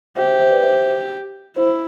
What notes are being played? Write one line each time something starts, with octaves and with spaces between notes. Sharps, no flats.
G4 C5 E5
C5 E5
C5 E5
B4 D5
C5 E5
E4 C5